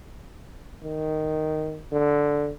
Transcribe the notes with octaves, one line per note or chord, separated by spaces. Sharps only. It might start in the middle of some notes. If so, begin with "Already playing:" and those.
D#3
D3